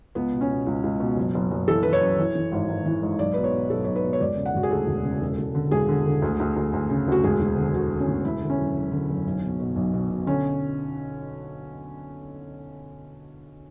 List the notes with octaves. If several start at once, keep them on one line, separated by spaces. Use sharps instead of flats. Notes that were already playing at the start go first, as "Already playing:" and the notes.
C#2 B3
B2
C#4
B2
C#2
C#2
B2
F#1
F#1
F#1
E3 A4
E3 B4
C#5
F#2
E3
E3
G#1
G#1
E3
G#2
B1 D5
B2 B4
C#5
B2
B1 A4
B1 C#5
B4
B2
C#5
E1 D5
C#3
F#5
E1 F#4
G#4
D2 A4
E1
C#3
E1
E1
D3
E1 G#4
D3
D3
D2
D2
D2
D2
C#3
D2 F#4
E1 G#4
E1
D3
D3 F#4
D3
C#4
E1
E2 E4
D3
C#4
F#1
F#1
D3
F#1
B1
B2
B2
B1
B2
B2
D3 C#4